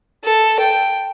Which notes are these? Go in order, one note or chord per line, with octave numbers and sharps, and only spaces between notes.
A4
G5